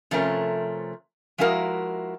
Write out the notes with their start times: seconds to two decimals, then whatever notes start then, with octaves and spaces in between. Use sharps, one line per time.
0.11 C3 F3 A3 C#4 A#4
1.38 F3 G#3 E4 F#4 A#4 F5